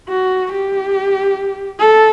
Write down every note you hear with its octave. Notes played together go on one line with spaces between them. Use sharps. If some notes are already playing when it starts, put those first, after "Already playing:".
F#4
G4
A4